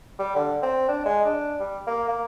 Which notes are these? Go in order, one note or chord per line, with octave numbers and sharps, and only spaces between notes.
G3
D3
C4
D4
G#3
D4
G3
A#3
A#3